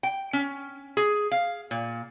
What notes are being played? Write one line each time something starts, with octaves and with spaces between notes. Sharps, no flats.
G5
C#4
G#4
F5
A#2